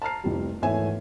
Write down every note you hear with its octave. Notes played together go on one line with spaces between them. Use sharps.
A5 A#5 F6 C7
F1 C2 F2 G3
G#1 E2 A3 C#5 E5 G#5